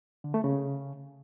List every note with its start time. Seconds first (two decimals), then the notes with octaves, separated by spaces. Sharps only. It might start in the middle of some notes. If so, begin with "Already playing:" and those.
0.24 D3
0.34 A3
0.44 C#3